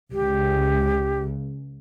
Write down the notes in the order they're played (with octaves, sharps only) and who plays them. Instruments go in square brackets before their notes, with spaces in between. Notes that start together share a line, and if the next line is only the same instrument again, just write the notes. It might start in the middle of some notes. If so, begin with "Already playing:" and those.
[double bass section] C#2 C#3 [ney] G4